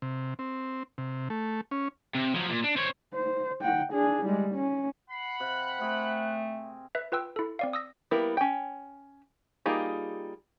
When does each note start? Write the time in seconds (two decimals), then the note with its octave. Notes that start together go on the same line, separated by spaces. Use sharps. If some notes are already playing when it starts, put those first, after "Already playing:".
0.02 C3
0.39 C4
0.98 C3
1.30 A3
1.71 C#4
2.15 C3
2.34 F3 F#3
2.50 A#2
2.64 D4
2.76 C4 C#5
3.14 C5
3.61 F#5 G5
3.92 D4 G#4
4.25 G3 G#3
4.55 C#4
5.11 F#5 B5 C7
5.40 C3 F5 F#6
5.79 A3 C4 G#4 A#4
6.95 B4 E5
7.12 F4 B4 G5 E6
7.36 E4 A4
7.59 C4 D5 F5
7.73 D#6 E6 A#6
8.11 G3 A#3 B3 E4 A#4
8.37 C#4 G5
9.66 G3 A#3 D#4 F4 G#4